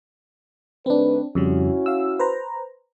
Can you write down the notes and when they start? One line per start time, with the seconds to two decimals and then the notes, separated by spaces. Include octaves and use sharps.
0.86 D#3 A3 C4 D4 B4
1.35 F2 C#3 G3 C#4 E4 F#4
1.86 F5 E6
2.19 B4 C5 A#5